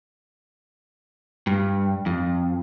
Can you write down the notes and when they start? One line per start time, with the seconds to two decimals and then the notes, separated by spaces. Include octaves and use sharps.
1.47 G2
2.06 F2